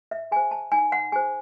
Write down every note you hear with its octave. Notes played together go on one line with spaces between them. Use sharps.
E5
G#4 C5 G#5
A5
D#4 G#5
F#5
G#4 C5 G#5